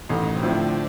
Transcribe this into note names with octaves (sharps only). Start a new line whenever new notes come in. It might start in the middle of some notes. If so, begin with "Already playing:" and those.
A1 D#3
C3
A2 D3 F3 C4